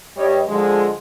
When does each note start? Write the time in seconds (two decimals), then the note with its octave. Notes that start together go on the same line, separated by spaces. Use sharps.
0.17 G2 G3 G4 C#5 D#5
0.48 D3 F3 G#3